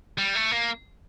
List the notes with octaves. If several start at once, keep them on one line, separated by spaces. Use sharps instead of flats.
G3
A3
A#3